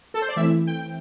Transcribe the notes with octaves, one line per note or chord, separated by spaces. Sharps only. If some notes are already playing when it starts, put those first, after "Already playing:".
A4
C5
D5
E3 A3 C4 E4 E5
G5